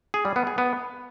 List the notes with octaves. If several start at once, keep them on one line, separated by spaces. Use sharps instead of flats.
G#4
G3
B3
G#4
B3